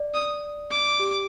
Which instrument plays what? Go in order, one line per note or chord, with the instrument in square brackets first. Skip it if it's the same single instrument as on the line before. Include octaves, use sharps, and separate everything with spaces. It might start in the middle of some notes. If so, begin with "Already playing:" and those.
Already playing: [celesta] D5
[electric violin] D#6
D6
[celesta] G4